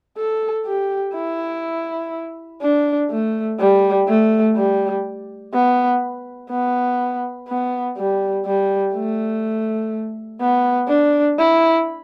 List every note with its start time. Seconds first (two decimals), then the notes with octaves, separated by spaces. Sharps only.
0.17 A4
0.66 G4
1.15 E4
2.62 D4
3.10 A3
3.59 G3
4.08 A3
4.56 G3
5.54 B3
6.50 B3
7.48 B3
7.97 G3
8.46 G3
8.94 A3
10.41 B3
10.88 D4
11.38 E4